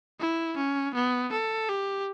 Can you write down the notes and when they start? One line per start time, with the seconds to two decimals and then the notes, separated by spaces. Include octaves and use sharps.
0.20 E4
0.57 C#4
0.94 B3
1.32 A4
1.69 G4